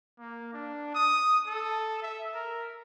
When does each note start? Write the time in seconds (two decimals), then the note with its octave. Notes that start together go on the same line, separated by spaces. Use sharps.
0.19 A#3
0.53 D4
0.95 D#6
1.47 A4
2.02 E5
2.34 A#4